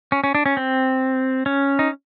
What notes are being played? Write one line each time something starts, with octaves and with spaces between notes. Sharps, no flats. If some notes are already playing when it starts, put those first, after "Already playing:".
C#4
C#4
D4
C#4
C4
C#4
D#4